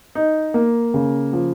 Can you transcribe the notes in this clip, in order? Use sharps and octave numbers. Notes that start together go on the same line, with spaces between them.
D#4
A#3
C#3
F3